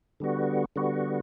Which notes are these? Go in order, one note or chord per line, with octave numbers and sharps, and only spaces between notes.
D3 G3 B3 F#4
D3 G3 B3 F#4